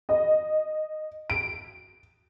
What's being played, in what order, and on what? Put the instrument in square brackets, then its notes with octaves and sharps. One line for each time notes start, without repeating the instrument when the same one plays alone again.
[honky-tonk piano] D#5
D7